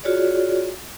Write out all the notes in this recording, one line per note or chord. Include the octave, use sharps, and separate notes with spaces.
F4 F#4 G#4 C#5 D5